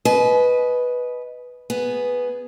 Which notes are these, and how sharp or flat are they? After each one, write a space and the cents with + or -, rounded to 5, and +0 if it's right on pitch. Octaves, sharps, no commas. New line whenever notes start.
B4 +0 D#5 +0 G#5 +45
B3 +0 G#4 +0